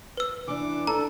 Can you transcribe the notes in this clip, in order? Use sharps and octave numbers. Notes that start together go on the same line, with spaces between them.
B4 E6
E3 D4 D6
D4 A4 A#5